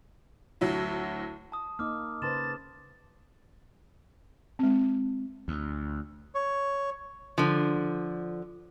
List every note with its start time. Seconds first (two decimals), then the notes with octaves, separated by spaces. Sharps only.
0.61 D2 F#3 E4
1.52 A5 D#6
1.79 A#3 D#4 D6 F6
2.22 C#3 B4 C5 A5 C6 A6 E7
4.59 G#3 C4
5.48 D2
6.35 C#5
7.38 D3 F3